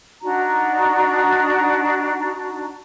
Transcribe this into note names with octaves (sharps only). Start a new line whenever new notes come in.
D4 D#4 F#4 A#5